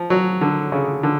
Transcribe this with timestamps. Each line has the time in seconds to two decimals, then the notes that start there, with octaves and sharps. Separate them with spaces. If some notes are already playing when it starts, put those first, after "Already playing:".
Already playing: F3
0.10 F#3
0.41 D3
0.72 C#3
1.03 D3